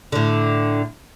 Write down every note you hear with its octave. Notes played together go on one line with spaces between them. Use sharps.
A2 D3